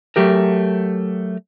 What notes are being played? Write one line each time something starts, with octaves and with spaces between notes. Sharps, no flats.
F#3 A3 G4 A#4